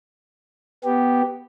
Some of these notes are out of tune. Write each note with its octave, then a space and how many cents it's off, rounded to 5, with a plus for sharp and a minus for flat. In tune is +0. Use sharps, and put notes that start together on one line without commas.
B3 +0 G4 +0